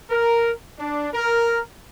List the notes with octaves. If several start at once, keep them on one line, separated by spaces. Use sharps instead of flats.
A#4
D4
A#4